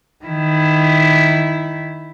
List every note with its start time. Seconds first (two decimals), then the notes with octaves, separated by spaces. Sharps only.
0.25 D#3 E4